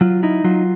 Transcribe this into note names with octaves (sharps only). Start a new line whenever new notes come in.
F#3 F4
D#4 E4
F#3 F4